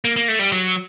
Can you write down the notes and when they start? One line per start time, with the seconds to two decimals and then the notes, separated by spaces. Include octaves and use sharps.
0.05 A#3
0.16 A#3
0.28 A3
0.39 G3
0.52 F#3